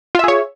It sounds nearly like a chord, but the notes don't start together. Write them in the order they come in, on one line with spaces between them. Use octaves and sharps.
F4 E5 G#4 C#5